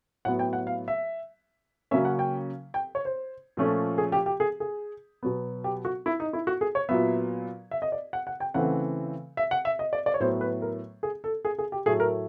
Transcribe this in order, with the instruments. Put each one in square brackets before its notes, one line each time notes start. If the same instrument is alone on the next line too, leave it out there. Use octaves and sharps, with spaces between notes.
[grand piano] A2 F#3 B3 F#5
G5
F#5
F5
E5
C#3 F#3 A#3 C#4 E5
F#5
G5
G5
C#5
C5
A#2 F3 A3 C#4
G#4
G4
G4
G#4
G#4
B2 F#3 B3
G4
F#4
E4
D#4
E4
F#4
G#4
C#5
A#2 F#3 B3 E5
E5
D#5
D5
F#5
F#5
G5
C#3 E3 A3 C4 F#5
E5
F#5
E5
D#5
D5
D5
C#5
A2 F#3 B3 C5
B4
A#4
G#4
A4
G#4
G#4
G4
A2 F#3 A3 G#4
A#4